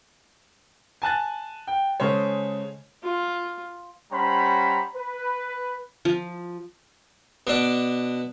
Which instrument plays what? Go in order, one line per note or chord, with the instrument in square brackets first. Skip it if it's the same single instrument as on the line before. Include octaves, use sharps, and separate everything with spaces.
[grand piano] G#5 A5 F#6 A6
G5
C#3 G#3 A4 C5 C#5
[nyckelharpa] F4
[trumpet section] G3 C#4 C5 F#5 A#5 B5
B4
[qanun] F3
[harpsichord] B2 D4